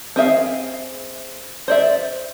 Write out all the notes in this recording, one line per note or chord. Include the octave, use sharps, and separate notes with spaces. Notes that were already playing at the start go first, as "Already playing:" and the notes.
C4 G#4 E5 F5
C5 D5 E5